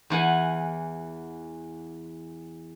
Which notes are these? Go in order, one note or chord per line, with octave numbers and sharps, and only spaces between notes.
E2 E3 F#5 G#5